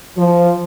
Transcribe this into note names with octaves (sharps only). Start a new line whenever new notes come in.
F3